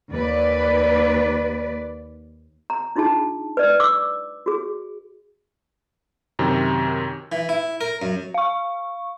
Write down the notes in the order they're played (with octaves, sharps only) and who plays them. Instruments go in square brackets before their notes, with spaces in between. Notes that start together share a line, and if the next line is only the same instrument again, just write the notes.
[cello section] D#2 B4 D5
[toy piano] A#5
D4 D#4 F4 G#4 A5
B4 D5
D6 E6
F#4 G#4
[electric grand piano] F#2 C3 D#3
[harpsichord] E3
E4
A#4
F#2
[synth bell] F5 C#6